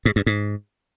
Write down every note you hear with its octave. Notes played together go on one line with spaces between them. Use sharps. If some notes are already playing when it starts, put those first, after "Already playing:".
G#2
G2
G#2